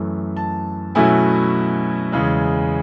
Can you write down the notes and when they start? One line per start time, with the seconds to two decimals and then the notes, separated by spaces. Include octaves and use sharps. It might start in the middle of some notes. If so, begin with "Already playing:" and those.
Already playing: F#2 E3 A3
0.37 A5
0.95 B2 F#3 A3 C#4 E4 G#5
2.12 E2 C#3 G#3